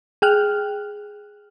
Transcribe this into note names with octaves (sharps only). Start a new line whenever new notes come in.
G#4 G5 F6 F#6